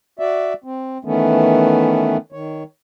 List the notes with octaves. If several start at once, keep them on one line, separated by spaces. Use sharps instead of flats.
F#4 D5 E5
C4
D#3 E3 A3 B3 C#4
D#3 C#5